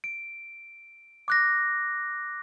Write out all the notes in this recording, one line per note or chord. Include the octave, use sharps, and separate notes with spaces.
D7
D6 F#6 A#6